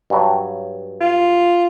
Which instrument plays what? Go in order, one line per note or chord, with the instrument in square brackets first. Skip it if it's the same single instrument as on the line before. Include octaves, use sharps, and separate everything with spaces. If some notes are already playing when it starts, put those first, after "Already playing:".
[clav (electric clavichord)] G2 F#3
[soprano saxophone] F4